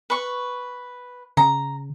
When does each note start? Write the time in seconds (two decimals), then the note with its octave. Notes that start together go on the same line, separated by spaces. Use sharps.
0.10 B4 C#6
1.37 C#3 A#5